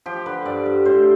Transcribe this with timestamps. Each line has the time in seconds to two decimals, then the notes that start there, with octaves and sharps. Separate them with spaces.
0.06 F3 G4
0.26 D3 B4
0.45 G2 D5
0.66 G2
0.85 A2 C5